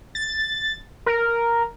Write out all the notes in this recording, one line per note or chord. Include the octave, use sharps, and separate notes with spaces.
A6
A#4